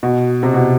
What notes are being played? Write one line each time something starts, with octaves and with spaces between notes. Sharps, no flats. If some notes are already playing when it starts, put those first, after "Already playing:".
B2
C3
B2